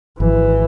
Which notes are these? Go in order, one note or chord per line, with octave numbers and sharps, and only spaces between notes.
G#1 E3